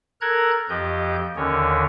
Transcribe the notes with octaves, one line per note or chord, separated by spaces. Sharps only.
A4 A#4 A#5 F#6 G#6
F2 F3 G4 D#5 G6
D#2 D3 D#3 C#4 C#5